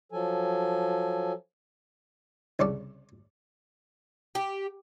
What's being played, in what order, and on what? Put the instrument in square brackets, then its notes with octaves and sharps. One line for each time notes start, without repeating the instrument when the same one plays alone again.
[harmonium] F3 F#3 A4 G#5
[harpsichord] C2 C#3 A4 D5
[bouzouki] G4